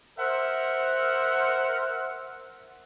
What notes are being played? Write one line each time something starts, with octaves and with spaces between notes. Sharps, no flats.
A#4 C5 E5 F#5